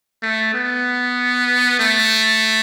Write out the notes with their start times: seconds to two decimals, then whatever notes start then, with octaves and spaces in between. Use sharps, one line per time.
0.22 A3
0.54 B3
1.80 A3